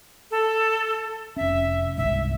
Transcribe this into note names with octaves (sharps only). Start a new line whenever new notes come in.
A4
F1 C#4 E5
G1 C2 G#2 E5